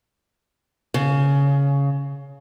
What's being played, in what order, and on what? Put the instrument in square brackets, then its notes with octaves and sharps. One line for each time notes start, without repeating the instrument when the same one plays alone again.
[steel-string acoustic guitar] C#3